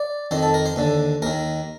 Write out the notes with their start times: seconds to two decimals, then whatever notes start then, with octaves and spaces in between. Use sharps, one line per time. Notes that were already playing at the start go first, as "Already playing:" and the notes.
Already playing: D5
0.31 F2 D#3 C5
0.43 A4
0.54 A#4
0.66 C5
0.76 D#2 D3
1.22 D#2 D#3 A#4